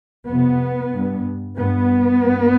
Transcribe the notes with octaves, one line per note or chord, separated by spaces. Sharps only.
F2 C3 B3
G2
G2 B3
G2